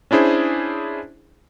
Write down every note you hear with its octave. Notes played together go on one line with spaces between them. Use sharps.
C#4 D4 E4 G#4 C5